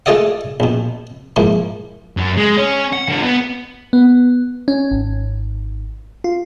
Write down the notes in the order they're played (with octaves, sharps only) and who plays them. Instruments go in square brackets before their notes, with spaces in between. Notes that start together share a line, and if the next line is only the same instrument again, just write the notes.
[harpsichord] A3 F4 G#4 D5 D#5 F#5
A#1 B2
G#2 E3 F3 A#3
[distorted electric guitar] F#2 F#3
G#3
C#4
F#5
D3 F4
B3
[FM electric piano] B3
C#4
G#1
F4